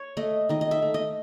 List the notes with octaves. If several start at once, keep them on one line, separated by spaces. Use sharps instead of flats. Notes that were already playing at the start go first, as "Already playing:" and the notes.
Already playing: C#5
A3 D#5
D#3 D#5
D#5
E5
A3
D#5